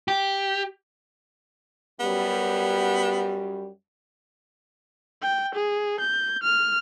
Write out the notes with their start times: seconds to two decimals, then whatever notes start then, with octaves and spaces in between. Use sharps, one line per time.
0.08 G4
2.00 F#2 G3 B3
5.22 G5
5.54 G#4
6.00 G6
6.43 F6